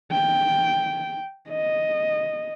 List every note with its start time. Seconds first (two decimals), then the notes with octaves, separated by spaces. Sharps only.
0.12 G5
1.49 D#5